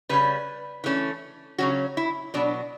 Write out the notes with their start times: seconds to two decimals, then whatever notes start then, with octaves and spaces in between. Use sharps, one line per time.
0.09 C#3 G3 C#4 B4
0.84 E3 A3 C#4
1.58 C#3 F#3 C#4 F#4
1.97 E4
2.34 B2 F#3 B3 D4